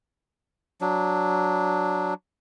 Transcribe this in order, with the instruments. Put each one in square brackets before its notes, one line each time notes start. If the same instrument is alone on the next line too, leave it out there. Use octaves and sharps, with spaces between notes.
[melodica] F#3 D4